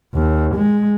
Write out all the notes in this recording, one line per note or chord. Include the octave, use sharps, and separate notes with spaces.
D#2
G#3